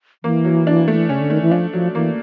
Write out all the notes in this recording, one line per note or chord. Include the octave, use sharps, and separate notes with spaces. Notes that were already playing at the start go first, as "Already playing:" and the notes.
E3 A#3
F#3
D4
A3
C#3 C#4
D3
D#3 A3
E3
F3 D4
F3 F#3
E3 A#3